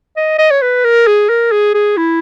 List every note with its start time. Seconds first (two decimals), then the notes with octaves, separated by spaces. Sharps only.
0.16 D#5
0.38 D#5
0.51 C#5
0.62 B4
0.84 A#4
1.07 G#4
1.29 A#4
1.51 G#4
1.74 G#4
1.97 E4